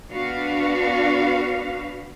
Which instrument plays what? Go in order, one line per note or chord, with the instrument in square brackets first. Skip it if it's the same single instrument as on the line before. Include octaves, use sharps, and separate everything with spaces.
[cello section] B3 D4 F#4 B4 F5